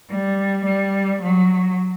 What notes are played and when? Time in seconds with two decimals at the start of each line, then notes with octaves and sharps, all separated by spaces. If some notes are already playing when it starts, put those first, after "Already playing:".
0.09 G3
0.65 G3
1.22 F#3